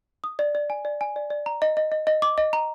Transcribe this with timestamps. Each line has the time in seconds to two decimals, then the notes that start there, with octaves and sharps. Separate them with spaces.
0.24 D#6
0.39 D5
0.55 D5
0.70 G#5
0.85 D5
1.01 G#5
1.16 D5
1.30 D5
1.46 A#5
1.62 D#5
1.77 D#5
1.92 D#5
2.07 D#5
2.22 D6
2.38 D#5
2.53 A#5